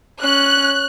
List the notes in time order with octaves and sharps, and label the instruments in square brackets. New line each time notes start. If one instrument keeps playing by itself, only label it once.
[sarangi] C#4 [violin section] F#6